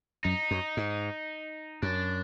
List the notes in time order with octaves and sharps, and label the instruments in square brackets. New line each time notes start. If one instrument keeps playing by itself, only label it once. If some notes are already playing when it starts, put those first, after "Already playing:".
[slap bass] F#2 [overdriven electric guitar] D#4
[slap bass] F#2
G#2
[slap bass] F#2 [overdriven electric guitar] D4